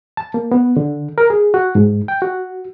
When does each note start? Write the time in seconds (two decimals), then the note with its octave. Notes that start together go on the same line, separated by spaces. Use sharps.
0.17 A5
0.34 A#3
0.52 B3
0.77 D3
1.18 A#4
1.30 G#4
1.54 F#4
1.75 G#2
2.08 G5
2.22 F#4